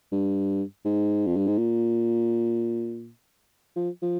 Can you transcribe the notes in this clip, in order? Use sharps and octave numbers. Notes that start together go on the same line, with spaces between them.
G2
G#2
F2
G2
G#2
A#2
F3
F3